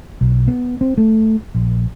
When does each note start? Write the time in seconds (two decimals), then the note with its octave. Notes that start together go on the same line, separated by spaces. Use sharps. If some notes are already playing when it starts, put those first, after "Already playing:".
0.21 B1
0.48 B3
0.81 C4
0.98 A3
1.55 A#1